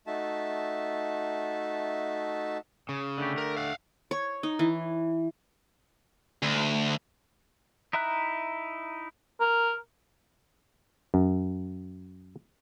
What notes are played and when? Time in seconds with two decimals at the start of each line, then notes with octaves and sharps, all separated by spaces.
0.07 A3 D#4 F#4 E5 A5
2.89 C#3
3.18 D3 A3 G4
3.38 A#4
3.57 F5 F#5
4.11 C#5
4.43 D#4
4.59 E3
6.43 D2
7.93 D#4 E4 E5 A#5 F#6
9.40 A#4
11.14 F#2